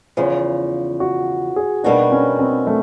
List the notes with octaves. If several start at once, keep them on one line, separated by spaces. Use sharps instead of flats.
E2 C#3 F3
F#4
G#4
B2 G3 A#3 D4 D#4 F#4
C#4
C4
A3